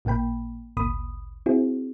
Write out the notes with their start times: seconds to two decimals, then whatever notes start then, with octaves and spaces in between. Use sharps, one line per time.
0.05 A1 A#2 A#3 G5 B5
0.77 G#1 D2 A#2 B5 D#6
1.46 C4 E4 F#4 G#4